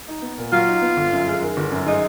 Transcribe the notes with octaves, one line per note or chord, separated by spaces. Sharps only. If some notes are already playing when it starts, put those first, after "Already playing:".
D#4
B3
A#2
F#3 F4
D#4
B3
G1
F#2
G#3
D#3
G1
F#2
G#3 D#4